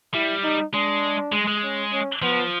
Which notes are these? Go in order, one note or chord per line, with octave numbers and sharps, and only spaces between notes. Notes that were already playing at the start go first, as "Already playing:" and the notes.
G3 E4
D#4
G#3 D4
G#3
G#3
C#4
C#4
F3 B3